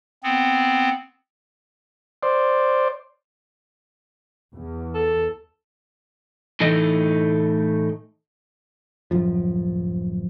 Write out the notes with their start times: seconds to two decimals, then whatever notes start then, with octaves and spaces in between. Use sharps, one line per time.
0.23 B3 C4
2.23 C5 D5
4.53 E2
4.95 A4
6.60 A2 E3 A3 D#4 D#5
9.11 D1 F#2 F3